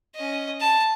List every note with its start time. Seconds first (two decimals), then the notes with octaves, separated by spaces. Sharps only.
0.15 C#4 D#5
0.60 A5